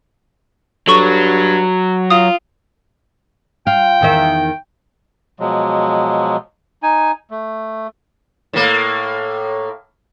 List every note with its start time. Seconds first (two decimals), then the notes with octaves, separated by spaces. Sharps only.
0.88 G2 F#3 A4 C#6
2.10 F4 D#6
3.67 F4 G5
4.01 E2 D#3 E5
5.40 B2 F3 F#3 G#3
6.83 D#4 G#5
7.31 A3
8.53 A2 A#3